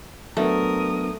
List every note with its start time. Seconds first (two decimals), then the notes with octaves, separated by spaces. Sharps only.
0.37 F#3 A3 B3 D4 A#4 D#6